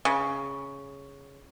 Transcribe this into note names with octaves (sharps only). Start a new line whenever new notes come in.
C#3